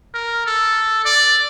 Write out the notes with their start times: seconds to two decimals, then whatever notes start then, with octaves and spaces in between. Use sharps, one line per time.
0.14 A#4
0.46 A4
1.05 D5